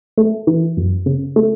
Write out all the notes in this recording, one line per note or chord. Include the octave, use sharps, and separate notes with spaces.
A3
E3
F#2
C#3
A3